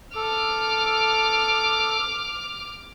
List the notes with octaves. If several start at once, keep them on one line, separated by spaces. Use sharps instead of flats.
A4 D6 F6